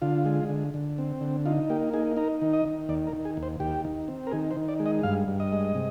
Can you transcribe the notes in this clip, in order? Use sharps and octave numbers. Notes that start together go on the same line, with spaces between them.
D3 F4
G#3
D3
D3
C4
D3
D#4 F4
A#3 G4
D#4 G#4
D#4 A#4
D#3
D#5
D#3
D#2 D5
A#4
D#3
G#4
D#2
C5
D#2 G4
D#3
C4
A#4
D#3 G#4
C5
D#3
D5
G#3
D#5
G2 F5
G2
D#5
G#3
C3